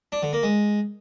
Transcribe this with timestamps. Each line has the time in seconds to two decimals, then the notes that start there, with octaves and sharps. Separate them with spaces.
0.12 D4
0.23 D3
0.33 A#3
0.43 G#3